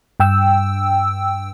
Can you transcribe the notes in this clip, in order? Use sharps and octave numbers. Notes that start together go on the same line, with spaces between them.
G2 G5 E6